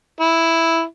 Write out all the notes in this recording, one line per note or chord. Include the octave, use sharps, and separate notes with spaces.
E4